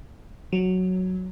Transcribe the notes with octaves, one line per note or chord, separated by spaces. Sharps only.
F#3